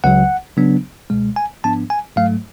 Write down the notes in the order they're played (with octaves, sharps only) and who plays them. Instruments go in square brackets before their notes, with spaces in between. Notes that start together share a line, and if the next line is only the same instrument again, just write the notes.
[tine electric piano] C#2 C#3 F#3 F#5
C#3 F#3 B3 D4
C#2 B2 G#3
G#5
G#2 F3 B3 D4 A5
G#5
G#2 F#3 A3 F5